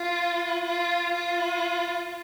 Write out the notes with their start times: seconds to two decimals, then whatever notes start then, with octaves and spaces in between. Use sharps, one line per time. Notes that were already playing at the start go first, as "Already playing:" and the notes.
Already playing: F4
0.65 F4
1.14 F4